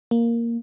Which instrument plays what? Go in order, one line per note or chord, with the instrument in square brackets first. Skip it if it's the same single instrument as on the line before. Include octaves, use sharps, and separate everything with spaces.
[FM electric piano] A#3